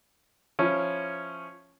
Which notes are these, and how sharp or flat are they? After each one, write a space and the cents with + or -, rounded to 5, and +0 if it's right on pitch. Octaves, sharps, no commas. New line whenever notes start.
F3 +0 C#4 -5 E4 +0